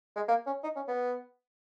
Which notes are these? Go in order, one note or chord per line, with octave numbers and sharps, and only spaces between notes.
G#3
A#3
C#4
D#4
C#4
B3